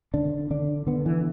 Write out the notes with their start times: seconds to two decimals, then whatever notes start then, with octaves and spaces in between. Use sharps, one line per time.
0.14 D3 D4
0.51 D3 D4
0.87 D3 B3
1.06 E3